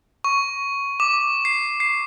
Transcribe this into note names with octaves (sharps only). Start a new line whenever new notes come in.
C#6
D6
C7
C7